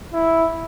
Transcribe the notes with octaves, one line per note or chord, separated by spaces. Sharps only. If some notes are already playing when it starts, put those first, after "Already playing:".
E4